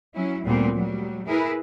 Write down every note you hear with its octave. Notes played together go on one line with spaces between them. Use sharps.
F#3 C#4 E4
D2 A#2 G3 A3 B3 C4
F#3 G3
E4 G#4 A#4 B4